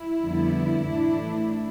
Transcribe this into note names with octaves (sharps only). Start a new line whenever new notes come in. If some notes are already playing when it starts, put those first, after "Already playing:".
Already playing: E4
F2 D3 G3 B3
A2 E3 A3 D4